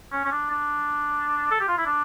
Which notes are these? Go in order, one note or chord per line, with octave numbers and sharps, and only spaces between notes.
C#4
C#4
D4
D4
A4
G4
F4
E4
D4